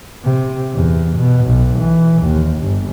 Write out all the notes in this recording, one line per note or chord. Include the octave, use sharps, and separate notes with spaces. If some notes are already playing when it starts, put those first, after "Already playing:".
C3
E2
B2
B1
E3
D#2
G1